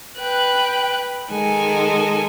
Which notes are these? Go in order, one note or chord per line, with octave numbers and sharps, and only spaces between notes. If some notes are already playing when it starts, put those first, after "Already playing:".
B4 G5 F#6
D#3 G#3 A4 G#5